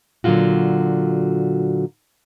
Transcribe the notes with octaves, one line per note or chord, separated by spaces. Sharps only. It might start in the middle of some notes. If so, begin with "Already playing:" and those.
A#2 D3 F#3 G#3 F4 F#4